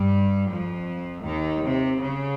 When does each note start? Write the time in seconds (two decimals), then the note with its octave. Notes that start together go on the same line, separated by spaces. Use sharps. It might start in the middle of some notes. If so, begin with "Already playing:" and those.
Already playing: G2 G3
0.51 F2 F3
1.25 D#2 D#3
1.64 C3
2.01 C#3